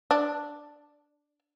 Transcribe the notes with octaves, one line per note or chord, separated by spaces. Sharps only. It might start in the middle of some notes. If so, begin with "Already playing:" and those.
D4